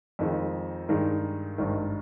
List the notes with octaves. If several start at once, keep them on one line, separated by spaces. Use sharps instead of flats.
F2 D#3 G#3
G2 D#3 G#3 D#4
G#1 G2 D#3